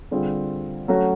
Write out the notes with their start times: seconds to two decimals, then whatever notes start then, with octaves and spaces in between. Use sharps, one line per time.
0.11 D3 G3 C4 F4 G#4
0.88 F#3 A3 C#4 F#4